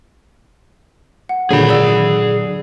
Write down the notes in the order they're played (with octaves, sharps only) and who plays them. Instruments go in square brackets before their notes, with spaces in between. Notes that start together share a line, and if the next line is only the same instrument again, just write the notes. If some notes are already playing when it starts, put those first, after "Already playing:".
[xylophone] F#5
[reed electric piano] A#2 D3 F#3 [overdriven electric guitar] G#4 B5
[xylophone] D5 E6